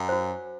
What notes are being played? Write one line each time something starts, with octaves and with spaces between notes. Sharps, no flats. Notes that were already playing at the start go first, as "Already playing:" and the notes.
Already playing: F#2
F#4 C5